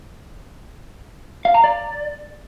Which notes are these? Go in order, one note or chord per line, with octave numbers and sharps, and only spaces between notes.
F5
A#5
D5